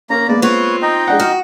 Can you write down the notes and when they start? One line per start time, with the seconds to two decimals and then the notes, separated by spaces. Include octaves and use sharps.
0.10 A#3 C#4 A#4 A#5
0.29 G#3 A#3 B3 D5
0.42 C4 F4 B4 C#5
0.82 D#4 D#5 G5
1.08 G#3 D4 F#5
1.20 F#4 F6